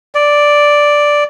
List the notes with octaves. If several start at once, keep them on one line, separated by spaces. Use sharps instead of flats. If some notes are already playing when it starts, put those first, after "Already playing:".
D5